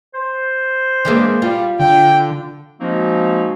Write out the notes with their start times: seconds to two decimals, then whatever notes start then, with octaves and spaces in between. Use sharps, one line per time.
0.14 C5
1.05 E3 G#3 A#3 D4
1.42 G3 F4
1.80 D3 G5
2.79 F3 G#3 A#3 C4 D#4 F#4